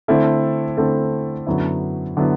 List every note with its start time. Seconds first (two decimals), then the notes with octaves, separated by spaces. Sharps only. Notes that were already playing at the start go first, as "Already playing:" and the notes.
0.08 D3 A3 C4 E4 A4
0.77 D3 A3 C4 E4 A4
1.47 F#2 D3 F#3 B3 E4
2.17 D3 F#3 B3 E4